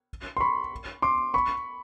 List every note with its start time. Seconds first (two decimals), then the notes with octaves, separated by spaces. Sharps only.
0.37 C6
0.40 B5 C#6
1.02 C6 D6
1.34 B5 C#6